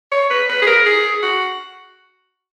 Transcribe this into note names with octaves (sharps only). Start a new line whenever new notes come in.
C#5
B4
B4
G#4
A#4
G#4
F#4